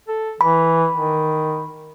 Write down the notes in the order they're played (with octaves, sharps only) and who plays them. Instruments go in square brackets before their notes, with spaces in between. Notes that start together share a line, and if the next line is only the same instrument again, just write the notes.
[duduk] A4
[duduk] E3 [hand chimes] B5
[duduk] D#3